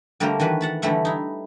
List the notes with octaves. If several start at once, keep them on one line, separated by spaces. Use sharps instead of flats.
D3 G3 A3 A#3 A#4 C5
D#3 E3 F#4 B4
F#5 A5 B5
D3 E3 G3 A3 E5 F#5
D#4 E4